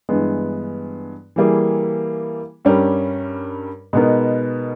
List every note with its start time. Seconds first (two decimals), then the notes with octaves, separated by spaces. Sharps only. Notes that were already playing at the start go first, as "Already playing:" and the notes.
0.09 G2 E3 G#3 B3
1.36 E3 G3 A#3 E4 G#4
2.65 G2 G3 C#4 G4 A#4
3.93 B2 G#3 B3 D#4 A#4